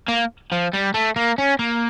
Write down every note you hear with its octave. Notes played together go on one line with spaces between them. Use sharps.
A#3
F3
G3
A3
A#3
C#4
A#3